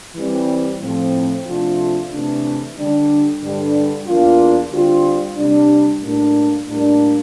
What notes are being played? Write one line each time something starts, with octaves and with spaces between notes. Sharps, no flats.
E3 G3 C4
A2 F3 C4
C3 F3 A3 D4 F4
C3 E3 A3 D4
D3 G3 D4
G2 D3 G3
E2 E3 A#3 D4 F4
D3 G3 C4 F4
C3 G3 D4
A2 G3 A#3 D4
A2 G3 A#3 D4